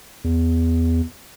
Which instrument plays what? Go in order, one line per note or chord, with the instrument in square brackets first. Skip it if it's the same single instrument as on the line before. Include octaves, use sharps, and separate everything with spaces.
[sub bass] E2